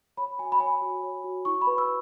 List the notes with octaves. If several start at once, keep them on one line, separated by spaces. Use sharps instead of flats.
C#5 B5
F#4 G#5
B5
C#5 G#5
F#4
C#5
F#4
E4 C#6
B5
B4
E6